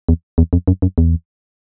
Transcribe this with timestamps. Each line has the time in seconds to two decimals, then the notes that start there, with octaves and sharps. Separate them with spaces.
0.09 E2
0.38 E2
0.53 F2
0.68 F#2
0.82 F#2
0.98 E2